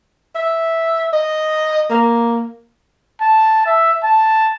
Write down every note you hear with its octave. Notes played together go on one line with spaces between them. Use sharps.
E5
D#5
A#3
A5
E5
A5